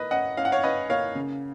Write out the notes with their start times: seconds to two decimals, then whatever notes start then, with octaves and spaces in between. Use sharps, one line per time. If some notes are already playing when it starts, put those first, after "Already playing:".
Already playing: A#3 B4 D#5
0.11 C#4 D#5 F#5
0.37 C#4 F5
0.45 F#5
0.52 C#5 F5
0.63 C#4 B4 D#5
0.90 A#3 C#5 F5
1.15 C#3